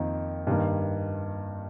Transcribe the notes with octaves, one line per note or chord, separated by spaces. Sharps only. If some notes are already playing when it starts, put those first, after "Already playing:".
Already playing: F2 D#3 A#3
G2 D#3 A#3